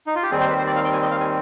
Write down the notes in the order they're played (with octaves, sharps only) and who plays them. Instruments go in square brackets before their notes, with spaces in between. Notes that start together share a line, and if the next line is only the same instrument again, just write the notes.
[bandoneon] D#4
F4
G4
D#2 D#3 G3 C4 G#4
C5
B4
C5
D5
F5
G5
G#5
D#5
F5
G#5